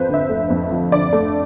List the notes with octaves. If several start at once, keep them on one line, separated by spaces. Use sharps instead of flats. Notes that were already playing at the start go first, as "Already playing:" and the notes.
Already playing: F2 F3 B4 C5
D3
E5
A3
F2
F3
D3 D5
A3